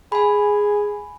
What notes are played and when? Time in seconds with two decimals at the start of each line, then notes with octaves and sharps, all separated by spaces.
0.12 G#4 G#5 B5